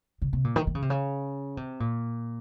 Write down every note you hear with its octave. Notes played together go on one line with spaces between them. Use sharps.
C#3
C3
A#2
D#3
D#3
C#3
C3
C#3
C3
A#2